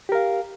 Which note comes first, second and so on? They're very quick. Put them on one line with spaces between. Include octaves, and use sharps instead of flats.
G4 A#4 F5